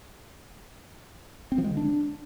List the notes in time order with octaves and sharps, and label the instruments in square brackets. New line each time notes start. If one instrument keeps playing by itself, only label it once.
[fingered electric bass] C4
F3
G#3
D3
D4